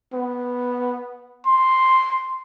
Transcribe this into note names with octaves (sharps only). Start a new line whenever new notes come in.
B3
C6